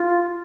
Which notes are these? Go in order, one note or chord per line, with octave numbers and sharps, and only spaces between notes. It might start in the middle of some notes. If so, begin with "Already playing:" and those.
Already playing: F4